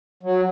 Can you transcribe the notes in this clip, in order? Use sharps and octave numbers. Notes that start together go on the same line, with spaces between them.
F#3